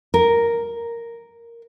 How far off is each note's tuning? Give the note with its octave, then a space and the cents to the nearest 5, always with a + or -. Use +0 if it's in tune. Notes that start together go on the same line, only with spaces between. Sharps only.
A#4 +0